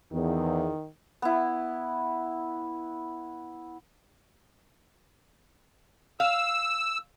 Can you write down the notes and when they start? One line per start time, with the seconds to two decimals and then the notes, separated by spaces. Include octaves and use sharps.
0.13 E2 D#3
1.22 B3 E4
6.20 F5 E6